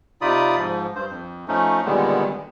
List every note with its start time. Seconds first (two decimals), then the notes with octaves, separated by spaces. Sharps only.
0.21 C3 D#4 F4 D5 B5 D#6
0.57 G#2 F3
0.95 G2 C5
1.10 F2
1.48 F3 A3 C#4 D#4
1.85 A#2 D3 D#3 G3 G#3 B3